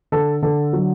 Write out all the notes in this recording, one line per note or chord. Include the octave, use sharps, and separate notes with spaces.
D3 A4
D3 A4
F#3